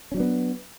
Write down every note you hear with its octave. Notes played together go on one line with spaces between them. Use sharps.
F#3 B3 C#4 D4